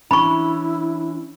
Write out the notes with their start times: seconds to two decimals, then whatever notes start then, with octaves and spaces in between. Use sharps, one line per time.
0.11 E3 C#4 D4 E4 B5 C#6